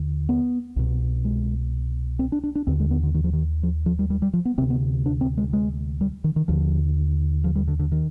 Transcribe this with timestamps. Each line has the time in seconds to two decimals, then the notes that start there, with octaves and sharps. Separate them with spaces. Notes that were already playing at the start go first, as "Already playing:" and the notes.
Already playing: D#2 D3
0.29 B3
0.76 C2 B2
1.25 G#3
2.19 C4
2.32 D4
2.44 D4
2.55 D4
2.67 D#2 D3 C4
2.80 G#3
2.91 B3
3.03 D3
3.14 D#3
3.24 F3
3.33 D#3
3.63 F3
3.86 F3
3.99 G3
4.10 G3
4.22 G3
4.33 F3
4.45 B3
4.58 D2 C3 C4
4.70 B3
5.06 D4
5.21 C4
5.38 G#3
5.53 G#3
6.01 G3
6.24 D#3
6.36 D#3
6.48 D#2 D3 F3
7.44 F3
7.55 G3
7.68 D3
7.79 D3
7.92 D#3